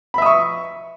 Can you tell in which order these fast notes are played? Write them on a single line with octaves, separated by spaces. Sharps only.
B5 E5 D#6 C#6